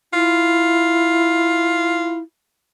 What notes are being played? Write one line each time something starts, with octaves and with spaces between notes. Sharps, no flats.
E4 F4